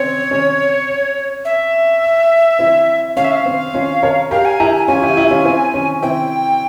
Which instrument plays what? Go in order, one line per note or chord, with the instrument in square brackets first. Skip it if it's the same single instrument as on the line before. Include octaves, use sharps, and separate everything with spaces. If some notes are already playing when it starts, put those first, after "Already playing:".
Already playing: [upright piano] C4 C#4 [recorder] C#5
[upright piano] C#4
[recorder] E5
[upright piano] C4 E4
[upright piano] C#4 [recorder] F5
[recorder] E5
F5
[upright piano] C4
C#4 F4
A#4 C#5
[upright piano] G4 A#4 [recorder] F5
[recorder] G#5
[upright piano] E4 G4 [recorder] A#5
[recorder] G#5
[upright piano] C#4 F4 [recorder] G#5
[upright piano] E4 G4
E4 G4
C#4 F4
C4 E4
C#4
[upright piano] C4 E4 [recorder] G5